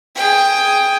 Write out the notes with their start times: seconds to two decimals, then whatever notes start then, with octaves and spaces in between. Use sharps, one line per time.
0.16 G#4 G5